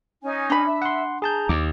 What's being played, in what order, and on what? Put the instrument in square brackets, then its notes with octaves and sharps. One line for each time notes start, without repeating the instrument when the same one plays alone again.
[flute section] C#4 D#4 G#5
[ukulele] D4 B5
[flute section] E5
[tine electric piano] F#5 C6
[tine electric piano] G#4 A5 G6 [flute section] A#5
[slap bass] D#2 [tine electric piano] D6